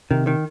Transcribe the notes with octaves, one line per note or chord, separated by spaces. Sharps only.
C3 D#3
D#3